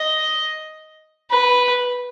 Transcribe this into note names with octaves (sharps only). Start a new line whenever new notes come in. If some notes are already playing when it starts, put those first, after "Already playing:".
Already playing: D#5
B4